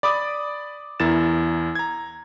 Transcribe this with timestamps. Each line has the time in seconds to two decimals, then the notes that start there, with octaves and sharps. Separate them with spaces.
0.03 D5 B5 D6 D#6
1.00 E2 E4 A#4 A6 E7
1.75 A#5 G#6